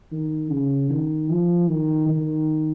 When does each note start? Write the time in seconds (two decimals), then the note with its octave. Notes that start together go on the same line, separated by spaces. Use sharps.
0.12 D#3
0.51 C#3
0.90 D#3
1.30 F3
1.69 D#3
2.09 D#3